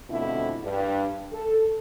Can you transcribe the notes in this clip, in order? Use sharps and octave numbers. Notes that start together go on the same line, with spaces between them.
F2 B2 D3 A3 C4 E4
G2
A4